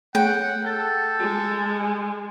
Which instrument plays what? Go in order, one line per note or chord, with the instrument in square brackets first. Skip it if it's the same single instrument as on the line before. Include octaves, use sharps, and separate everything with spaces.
[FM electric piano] A3 G#4 C#5 [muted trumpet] F#5 [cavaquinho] G5
[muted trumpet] A4 [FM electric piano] G6 A6
[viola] G#3